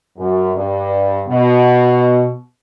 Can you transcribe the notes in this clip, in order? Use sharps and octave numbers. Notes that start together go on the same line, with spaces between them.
F#2
G2
B2